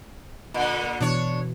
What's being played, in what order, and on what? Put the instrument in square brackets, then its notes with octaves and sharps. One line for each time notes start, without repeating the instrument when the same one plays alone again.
[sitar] A#2 D3
[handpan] B2 E3 [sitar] D4 C#5